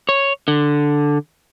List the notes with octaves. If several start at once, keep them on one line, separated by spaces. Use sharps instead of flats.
C#5
D3